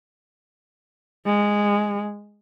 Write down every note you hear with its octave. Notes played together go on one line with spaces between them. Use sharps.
G#3